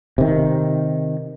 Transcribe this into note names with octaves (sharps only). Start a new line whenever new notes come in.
C3 D#3